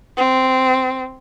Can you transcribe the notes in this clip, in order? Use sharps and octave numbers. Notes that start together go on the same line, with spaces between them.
C4